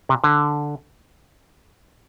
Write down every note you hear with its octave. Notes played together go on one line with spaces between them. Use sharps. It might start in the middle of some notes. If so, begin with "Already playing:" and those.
C3
D3